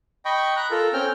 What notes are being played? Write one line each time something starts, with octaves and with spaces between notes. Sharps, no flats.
D#5 G5 B5 C#6
A#5 F#6
F4 A4 A#4
C4 C#4 G5 F6